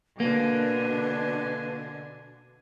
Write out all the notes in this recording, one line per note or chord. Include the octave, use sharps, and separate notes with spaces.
B2 D3 A#3 D4 B4 G#5